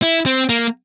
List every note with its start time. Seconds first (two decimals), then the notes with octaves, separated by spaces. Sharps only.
0.02 E4
0.26 C4
0.49 A#3